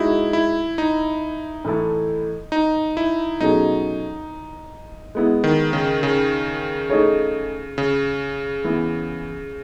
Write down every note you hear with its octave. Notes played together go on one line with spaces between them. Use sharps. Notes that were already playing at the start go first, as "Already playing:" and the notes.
Already playing: G#3 D#4 E4 F#4
E4
D#4
A2 E3 A3 E4 A4
D#4
E4
B2 F#3 A3 C#4 D#4 G#4
G#3 B3 E4
D#3
C#3
C#3
A3 D#4 G#4 C#5
C#3
E3 B3 E4